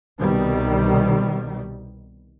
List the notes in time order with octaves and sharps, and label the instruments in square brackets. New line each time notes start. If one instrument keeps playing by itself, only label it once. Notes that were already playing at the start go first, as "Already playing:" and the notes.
[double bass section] C2 B2 D#3 G3